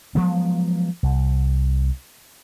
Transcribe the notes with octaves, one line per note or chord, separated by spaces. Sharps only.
F3 F#3 G#3 B3
C2